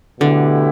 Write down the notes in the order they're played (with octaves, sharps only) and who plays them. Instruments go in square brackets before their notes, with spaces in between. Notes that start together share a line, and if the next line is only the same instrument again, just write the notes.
[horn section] B2 A3 E4 G4 [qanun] D3